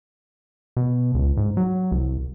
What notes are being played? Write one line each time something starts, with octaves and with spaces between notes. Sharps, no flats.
B2
C#2
G#2
F#3
C2